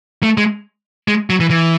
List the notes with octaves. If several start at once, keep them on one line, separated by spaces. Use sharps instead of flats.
A3
G#3
G#3
F#3
E3
E3